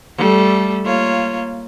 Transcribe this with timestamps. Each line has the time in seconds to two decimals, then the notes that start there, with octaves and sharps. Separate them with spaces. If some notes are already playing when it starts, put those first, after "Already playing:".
0.17 G3 A3 A4
0.85 A#3 F4 C#5